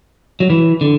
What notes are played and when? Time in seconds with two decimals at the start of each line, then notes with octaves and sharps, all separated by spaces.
0.40 F#3
0.50 E3
0.81 D3